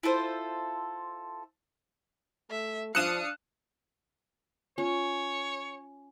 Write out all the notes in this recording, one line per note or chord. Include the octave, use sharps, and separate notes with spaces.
E4 F4 A4 C5
A3 E5
F3 D4 F5 D#6 F#6 C#7 E7
C#4 F4 C#5